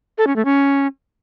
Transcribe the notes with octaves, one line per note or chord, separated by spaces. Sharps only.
A4
C#4
A3
C#4